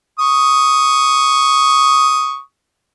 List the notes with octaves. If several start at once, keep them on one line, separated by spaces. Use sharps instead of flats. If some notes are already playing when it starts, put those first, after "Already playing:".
C#6 D#6